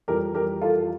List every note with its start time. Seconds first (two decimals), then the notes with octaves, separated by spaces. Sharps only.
0.08 F2 E3 G3 G4 A#4
0.35 G4 A#4
0.62 F4 A4